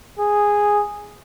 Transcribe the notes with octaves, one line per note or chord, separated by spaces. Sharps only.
G#4